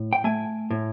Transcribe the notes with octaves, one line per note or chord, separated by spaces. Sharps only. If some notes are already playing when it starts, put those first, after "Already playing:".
Already playing: A2
G5
A3 G#5
A2